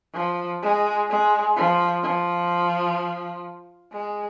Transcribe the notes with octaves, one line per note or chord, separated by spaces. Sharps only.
F3
G#3
G#3
F3
F3
G#3